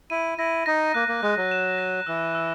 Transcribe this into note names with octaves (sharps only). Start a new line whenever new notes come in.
E4 D#7
E4 A#6
D#4 A#6
A#3 F#6
A#3
G#3 F#6
F#3
E7
A#6
E3 E6
E6